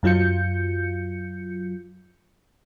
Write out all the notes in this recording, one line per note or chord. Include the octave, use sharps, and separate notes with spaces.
F#2 F#3 F4 G6 C#7